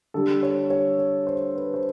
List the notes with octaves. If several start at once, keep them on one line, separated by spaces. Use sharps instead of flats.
D3 G3 A4
C#5
C#5
C#5
C5
B4
C5